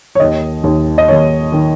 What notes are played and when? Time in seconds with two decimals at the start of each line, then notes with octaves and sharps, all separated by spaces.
0.15 C#5
0.19 D#2 D#3 D#5
0.64 D#2 D#3
0.98 D#5
1.08 D#2 D#3 C#5
1.52 D#3